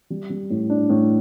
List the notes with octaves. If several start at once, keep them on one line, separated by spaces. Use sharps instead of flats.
G3
G3
A2
D4
A2